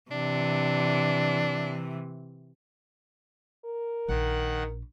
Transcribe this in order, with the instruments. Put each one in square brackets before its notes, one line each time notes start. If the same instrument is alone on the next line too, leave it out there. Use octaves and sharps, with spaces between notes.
[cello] C3 E3 [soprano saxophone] D4
[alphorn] A#4
[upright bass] A#1 [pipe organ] D#3 F#5